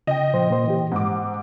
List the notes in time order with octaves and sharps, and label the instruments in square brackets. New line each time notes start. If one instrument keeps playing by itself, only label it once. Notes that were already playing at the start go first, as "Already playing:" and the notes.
[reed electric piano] C#3 [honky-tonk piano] D#5 G5
[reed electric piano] A#2 F3 C5
A#2 A#3 C5
E3 G4
[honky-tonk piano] G#2 D6 [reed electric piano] F#5